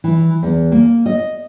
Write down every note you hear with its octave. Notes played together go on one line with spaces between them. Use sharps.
E3
E2
A#3
D#5